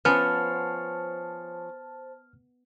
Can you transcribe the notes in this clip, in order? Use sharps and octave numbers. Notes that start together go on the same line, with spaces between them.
F3 B3 C#4 C5 A5 F6